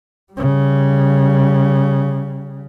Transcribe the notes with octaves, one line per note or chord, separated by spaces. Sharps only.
C#3 G3